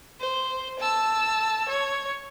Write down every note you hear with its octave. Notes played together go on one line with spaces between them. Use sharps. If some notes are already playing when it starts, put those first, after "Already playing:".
C5
A5 E6
C#5